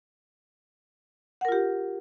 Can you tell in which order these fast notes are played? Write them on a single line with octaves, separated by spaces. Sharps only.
F#5 A#4 F4 G4